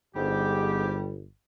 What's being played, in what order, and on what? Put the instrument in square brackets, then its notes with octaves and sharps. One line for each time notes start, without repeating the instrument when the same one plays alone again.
[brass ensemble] G1 [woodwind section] F2 G#2 G4 [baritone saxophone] G3